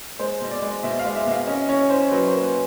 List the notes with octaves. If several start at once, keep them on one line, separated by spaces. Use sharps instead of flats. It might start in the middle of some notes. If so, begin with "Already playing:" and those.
G#3 C5
B2
D5
G#3
B2 E5
F5
G#3
E5
B2
F5
C#4 D#5
C#4 C#5
C#4 C5
F#3 B4
C5
A#3
B4